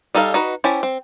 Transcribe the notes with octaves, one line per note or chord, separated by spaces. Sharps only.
G3 D#4 A4 B4 F5
D#4 F#4 B4
C#4 E4 G4 C5 A5
C4